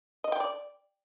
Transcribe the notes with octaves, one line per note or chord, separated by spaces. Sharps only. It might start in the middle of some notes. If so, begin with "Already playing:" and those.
D#5
G5
D5